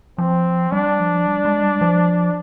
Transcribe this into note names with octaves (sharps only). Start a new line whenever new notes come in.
F3 C4
G3 D4
F3
G3
G#3
G3
F3